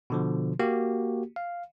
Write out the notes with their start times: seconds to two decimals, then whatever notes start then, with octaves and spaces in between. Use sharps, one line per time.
0.10 B2 D3 F3
0.59 A#3 F#4 G4
1.36 F5